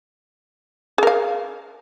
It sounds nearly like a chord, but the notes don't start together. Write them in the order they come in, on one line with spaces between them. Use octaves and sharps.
G#4 A#4 F5